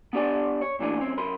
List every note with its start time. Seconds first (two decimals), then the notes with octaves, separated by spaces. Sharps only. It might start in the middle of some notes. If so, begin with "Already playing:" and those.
0.13 B3 D4 G4 D5 G#5
0.61 C#5
0.79 A#2 E3 A3 D4 G#5
1.00 F#2 C4 C#4
1.17 F#2 A#4 B5 C6